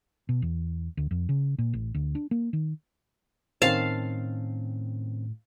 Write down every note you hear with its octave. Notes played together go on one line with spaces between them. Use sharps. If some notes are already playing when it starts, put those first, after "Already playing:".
B2
E2
D2
F2
C#3
A#2
A1
D2
D4
A#3
D#3
A2 D#3 C4 C#4 F5 A5